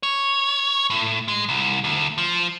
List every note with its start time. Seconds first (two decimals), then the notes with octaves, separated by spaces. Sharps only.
0.03 C#5
0.90 A2
1.28 G#3
1.49 C2
1.84 D2
2.18 F3